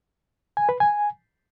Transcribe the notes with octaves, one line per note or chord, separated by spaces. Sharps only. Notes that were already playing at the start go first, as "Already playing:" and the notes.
G#5
B4
G#5